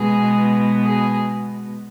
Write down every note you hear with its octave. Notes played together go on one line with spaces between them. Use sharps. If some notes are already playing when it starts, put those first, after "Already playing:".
Already playing: B2 G#3 B3 G#4
G#4